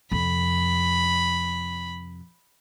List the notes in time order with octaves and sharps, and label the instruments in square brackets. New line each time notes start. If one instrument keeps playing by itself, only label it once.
[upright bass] F2 C3 [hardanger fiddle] B5